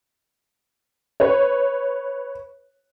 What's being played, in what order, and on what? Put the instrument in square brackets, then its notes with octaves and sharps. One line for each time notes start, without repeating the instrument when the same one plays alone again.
[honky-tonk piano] B4 C#5